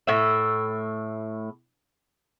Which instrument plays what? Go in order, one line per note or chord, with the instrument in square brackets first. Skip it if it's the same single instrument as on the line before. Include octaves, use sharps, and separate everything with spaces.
[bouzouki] A2 E5